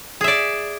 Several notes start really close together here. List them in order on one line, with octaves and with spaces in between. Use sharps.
G#4 E5 D5